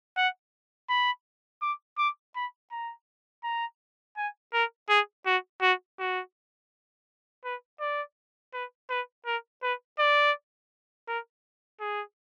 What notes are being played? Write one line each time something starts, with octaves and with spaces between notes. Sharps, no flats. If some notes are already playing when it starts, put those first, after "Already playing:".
F#5
B5
D6
D6
B5
A#5
A#5
G#5
A#4
G#4
F#4
F#4
F#4
B4
D5
B4
B4
A#4
B4
D5
A#4
G#4